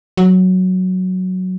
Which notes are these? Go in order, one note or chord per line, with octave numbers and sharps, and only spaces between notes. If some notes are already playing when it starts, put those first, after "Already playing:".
F#3